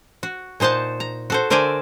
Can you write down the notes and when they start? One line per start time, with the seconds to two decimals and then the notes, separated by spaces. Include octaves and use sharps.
0.23 F#4
0.60 A#2 D#4 C5 F#5 A5
1.00 A#5
1.30 F#4 A4 C5
1.50 D3 A#4 C5 D5 E5 G#5